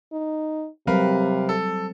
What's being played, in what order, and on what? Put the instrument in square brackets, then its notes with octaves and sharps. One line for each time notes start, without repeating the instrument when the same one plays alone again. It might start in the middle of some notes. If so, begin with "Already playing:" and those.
[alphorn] D#4
[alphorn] C3 [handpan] F#3 G3 C4 [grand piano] A#4 B4 F5
[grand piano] A4